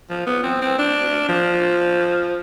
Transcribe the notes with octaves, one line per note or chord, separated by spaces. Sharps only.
F3
B3
C4
C4
D4
F3